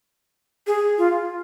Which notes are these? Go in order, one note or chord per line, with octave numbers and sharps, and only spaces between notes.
G#4
F4